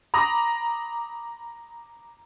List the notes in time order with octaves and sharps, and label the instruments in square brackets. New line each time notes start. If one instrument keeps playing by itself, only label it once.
[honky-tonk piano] A#5 B5 D6 D#6 A#6